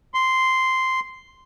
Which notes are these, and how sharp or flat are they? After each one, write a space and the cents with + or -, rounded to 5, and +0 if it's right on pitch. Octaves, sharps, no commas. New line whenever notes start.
C6 -5